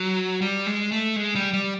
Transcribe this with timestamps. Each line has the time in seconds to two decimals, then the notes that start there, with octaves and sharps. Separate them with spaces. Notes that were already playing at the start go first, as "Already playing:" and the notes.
Already playing: F#3
0.42 G3
0.66 G#3
0.92 A3
1.16 G#3
1.35 G3
1.53 G3